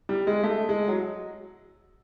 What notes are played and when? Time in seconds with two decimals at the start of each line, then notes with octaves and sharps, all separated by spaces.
0.09 G3
0.27 G#3
0.44 A3
0.69 G#3
0.88 F#3